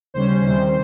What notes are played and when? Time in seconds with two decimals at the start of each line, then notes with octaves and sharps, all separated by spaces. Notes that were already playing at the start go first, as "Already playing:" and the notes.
0.14 D#2 C#3 G3 C#4 C5
0.44 C3 D#3 G3 C4 C5